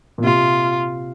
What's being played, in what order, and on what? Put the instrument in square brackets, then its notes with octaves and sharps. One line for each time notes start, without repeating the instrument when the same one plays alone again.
[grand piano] A#2
[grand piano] C3 [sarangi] F4